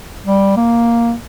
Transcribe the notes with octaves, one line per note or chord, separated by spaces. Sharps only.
G3
A#3